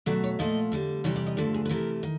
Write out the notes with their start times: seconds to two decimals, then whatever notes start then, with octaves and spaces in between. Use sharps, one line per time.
0.06 B2 F#3 A3 D5
0.24 C#5
0.39 A#2 F3 A3 D#5
0.72 F2 D3 G3
1.04 C3 E3 G3 C#5
1.16 D5
1.26 D#5
1.37 G2 D3 F3 A3 D5
1.54 G#4
1.65 B4
1.69 C3 E3 A3 A#4
2.03 D#3